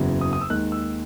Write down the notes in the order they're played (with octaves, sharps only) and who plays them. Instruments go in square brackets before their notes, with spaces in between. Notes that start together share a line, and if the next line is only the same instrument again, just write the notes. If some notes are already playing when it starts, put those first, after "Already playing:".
Already playing: [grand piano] F#1 E2 C#3 F#3
D#6
D#6
E6
D#2 D#3 G#3 F#6
E6